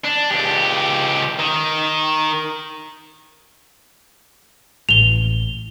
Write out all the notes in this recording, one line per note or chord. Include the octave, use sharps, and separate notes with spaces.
D4
C#2 G4
D#3
A1 F7 G7